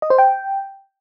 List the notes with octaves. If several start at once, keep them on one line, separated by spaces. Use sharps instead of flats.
D#5
C5
G5